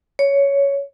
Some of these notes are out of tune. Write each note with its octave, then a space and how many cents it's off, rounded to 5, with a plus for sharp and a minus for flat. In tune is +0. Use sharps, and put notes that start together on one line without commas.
C#5 +10